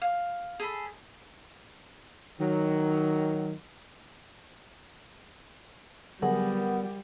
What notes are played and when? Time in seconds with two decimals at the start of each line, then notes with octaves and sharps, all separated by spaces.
0.02 F5
0.60 G#4 A4 B5
2.40 D#3 F#3
6.22 D3 F#3 G3 B3 G#4 A#4 F#5